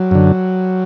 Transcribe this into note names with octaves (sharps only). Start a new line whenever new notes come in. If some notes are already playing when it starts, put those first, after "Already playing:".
Already playing: F#3
F#2 D3